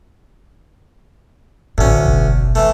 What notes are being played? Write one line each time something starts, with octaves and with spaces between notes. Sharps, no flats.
A1 D2 A2 C#4
F#1 B1
E3 A3